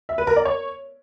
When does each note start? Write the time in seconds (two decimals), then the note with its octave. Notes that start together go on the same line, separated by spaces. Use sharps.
0.09 E5
0.18 B4
0.27 A#4
0.36 D5
0.45 C#5